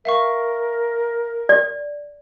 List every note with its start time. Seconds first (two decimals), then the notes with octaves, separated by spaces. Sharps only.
0.05 A#4 E5 F5 C#6
1.49 D5